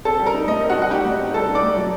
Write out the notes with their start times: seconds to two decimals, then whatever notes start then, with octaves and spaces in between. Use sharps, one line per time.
0.05 C4 A4 A5
0.19 G3
0.26 A#4 A#5
0.34 D#4
0.47 A2 D#5
0.62 C4
0.70 F#4 F#5
0.77 G3
0.82 F#5
0.91 D#4 G4 G5
1.05 A2
1.20 C4
1.34 G3 A4 A5
1.49 D#4
1.55 D5 D6
1.63 A2
1.77 F#3